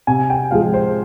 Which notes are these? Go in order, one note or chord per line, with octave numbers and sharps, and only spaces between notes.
C3 G#5
G5
F3 G#3 F5
C5